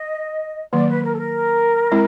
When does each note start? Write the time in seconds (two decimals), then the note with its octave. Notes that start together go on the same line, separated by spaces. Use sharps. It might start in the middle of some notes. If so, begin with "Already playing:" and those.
Already playing: D#5
0.73 D#3 F#3 A#3 D5
0.88 B4
1.03 A#4
1.13 A4
1.18 A#4
1.92 G#3 C4 E4